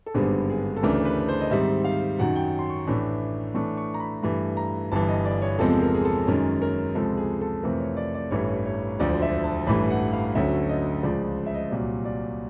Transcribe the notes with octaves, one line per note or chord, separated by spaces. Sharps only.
A4
G#1 G2 D3 G3 B3 G#4
G#4
A4
D2 C#3 E3 A3 D4 A#4
B4
C5
D#5
G#2 D#3 G3 C4 E5
F5
F#2 D#3 F#3 F#5
G5
C6
C#6
A1 A2 E3 A3 D4
A2 E3 A3 D4 C#6
C#6
A#5
B5
G2 E3 A3 B5
A#5
G1 G2 E3 A5
D#5
D5
C#5
E2 C3 F3 G#3 C4 A4
A#4
G#4
A4
F#2 D#3 G#3 C#4 A#4
A#4
C#2 C3 F3 G#3 A4
G#4
A4
F2 C3 E3 A3 C4 A#4
C#5
D5
D5
A1 G2 E3 A3 C#5
C#5
E1 D2 D3 F3 D5
E5
A5
A1 G2 E3 A3 B5
F#5
F5
D2 D3 F#3 A3 C#4 E5
D#5
C#2 C#3 F3 D5
E5
D#5
C2 A#2 F#3 D5
D5